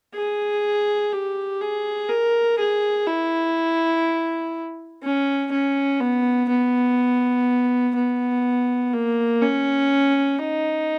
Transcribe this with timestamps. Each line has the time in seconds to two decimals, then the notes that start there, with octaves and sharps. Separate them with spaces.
0.14 G#4
1.12 G4
1.61 G#4
2.09 A#4
2.58 G#4
3.07 E4
5.03 C#4
5.51 C#4
6.00 B3
6.48 B3
7.95 B3
8.93 A#3
9.42 C#4
10.39 D#4